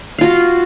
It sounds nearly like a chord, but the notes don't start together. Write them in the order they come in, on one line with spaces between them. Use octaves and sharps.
F5 F4 F#4